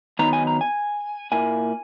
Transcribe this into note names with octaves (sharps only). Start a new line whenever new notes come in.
D#3 F#3 B3 D#4 A#5
G#5
A#5
G#5
A#2 A#3 E4 G#5